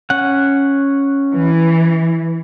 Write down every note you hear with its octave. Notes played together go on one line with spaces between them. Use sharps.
C#4 F#5
E3